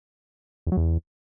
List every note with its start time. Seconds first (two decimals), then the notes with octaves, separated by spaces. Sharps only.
0.67 E2
0.72 F#3
0.77 E2